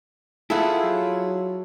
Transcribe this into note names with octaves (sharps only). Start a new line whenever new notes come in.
E4 F4 G#4 A4 E5 F#5
F#3